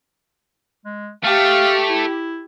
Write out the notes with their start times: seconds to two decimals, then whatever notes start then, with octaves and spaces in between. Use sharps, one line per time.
0.85 G#3
1.24 A3 G4 F5
1.89 E4